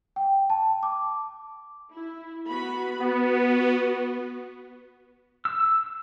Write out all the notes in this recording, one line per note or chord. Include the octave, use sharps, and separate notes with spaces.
G5
A5
D6
E4
B3 F#4 B5
B3 F#4
E6